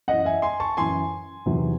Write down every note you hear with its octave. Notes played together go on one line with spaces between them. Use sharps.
F#2 E3 D#5 F#5
E5 G#5
G#5 C6
A5 C#6
F#2 E3 G#5 C6
E2 C3 D#3 F#3